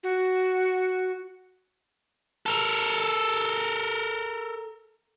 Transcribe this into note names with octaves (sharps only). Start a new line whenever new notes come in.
F#4
A4 A#4